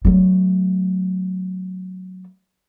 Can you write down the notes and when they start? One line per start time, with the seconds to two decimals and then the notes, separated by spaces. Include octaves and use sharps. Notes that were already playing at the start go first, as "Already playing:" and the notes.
0.05 F#3 A3